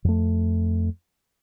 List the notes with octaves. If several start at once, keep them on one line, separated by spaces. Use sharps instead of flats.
F2 A3